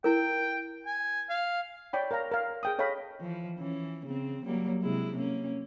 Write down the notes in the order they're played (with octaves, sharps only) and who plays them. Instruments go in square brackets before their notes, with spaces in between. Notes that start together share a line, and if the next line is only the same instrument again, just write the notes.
[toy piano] E4 A#4 [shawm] G5
[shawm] G#5
F5
[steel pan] C#5 D5 G5 B5
A#4 C#5 F5 A#5
A#4 F5
G#4 G5 D#6
A4 C#5 D#5 F5 G5 B5
[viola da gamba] E3 F3
E3 C#4
C#3 C4
F#3 G3 A#3
C3 G#3 E4
A#3 C#4